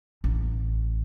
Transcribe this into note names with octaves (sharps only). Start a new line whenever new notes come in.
A1